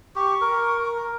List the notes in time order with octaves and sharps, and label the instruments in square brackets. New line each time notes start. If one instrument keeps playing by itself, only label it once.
[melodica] G4 [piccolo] C#6
[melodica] A#4